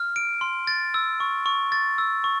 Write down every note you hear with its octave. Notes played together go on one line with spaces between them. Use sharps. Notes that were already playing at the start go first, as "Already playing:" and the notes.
Already playing: F6
D7
C6
A6
E6
C#6
C#6
A6
E6
C#6